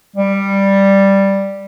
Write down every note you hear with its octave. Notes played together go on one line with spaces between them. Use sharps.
G3